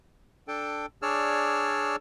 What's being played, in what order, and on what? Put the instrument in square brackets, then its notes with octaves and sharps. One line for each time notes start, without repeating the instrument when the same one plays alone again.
[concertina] D4 A4 G5
D4 G#4 C#5 D5 E6 F6